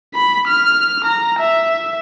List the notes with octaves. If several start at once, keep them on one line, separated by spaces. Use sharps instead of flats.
B5
F6
A#5
E5